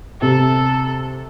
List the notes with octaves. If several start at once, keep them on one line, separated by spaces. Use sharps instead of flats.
C3 A4